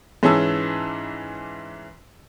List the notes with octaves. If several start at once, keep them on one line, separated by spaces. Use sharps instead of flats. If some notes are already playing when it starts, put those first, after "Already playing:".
G#2 E3 C#4 G#4 A5 E6